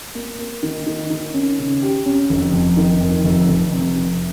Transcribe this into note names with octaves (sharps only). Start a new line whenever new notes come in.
A#3
A#3
D#3
D#3
D#3
C#4
C#3
G4
C#4
F1
F2
D#3
F2
F1
F1
C3
C3